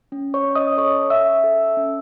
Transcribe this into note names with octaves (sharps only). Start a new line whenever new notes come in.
C#4
C#5 C#6
C#4
D#5 D#6
A4 C#5 C#6
C#4 E5 E6
A4
C#4